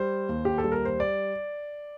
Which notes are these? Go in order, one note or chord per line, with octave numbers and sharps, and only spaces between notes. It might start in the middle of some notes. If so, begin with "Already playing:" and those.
Already playing: G3 C5
D#2
G4
A4
G3
A#4
C5
D5